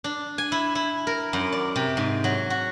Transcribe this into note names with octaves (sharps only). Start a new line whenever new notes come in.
D4
G#5
E4
E4
A#4
F#2
D5
C3
G#2
F#3
F#4